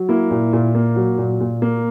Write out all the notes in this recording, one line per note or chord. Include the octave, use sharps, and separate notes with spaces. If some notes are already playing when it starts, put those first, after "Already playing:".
Already playing: F#3
A#3 E4
A#2
A#2
A#3
F#3
A#2
A#2
A#3